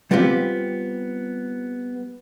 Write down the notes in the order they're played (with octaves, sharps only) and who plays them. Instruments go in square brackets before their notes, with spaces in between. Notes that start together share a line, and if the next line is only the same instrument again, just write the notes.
[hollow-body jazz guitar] G3 B3 C4 F4 G4